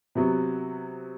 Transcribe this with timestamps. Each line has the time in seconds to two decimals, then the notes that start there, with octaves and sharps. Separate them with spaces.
0.15 C3 F#3 B3